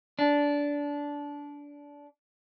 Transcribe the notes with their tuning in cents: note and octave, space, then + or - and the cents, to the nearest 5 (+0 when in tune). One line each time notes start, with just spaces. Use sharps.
D4 -20